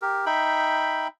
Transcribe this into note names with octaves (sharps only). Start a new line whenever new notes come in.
G4 A#4
D#4 E5 G5 B5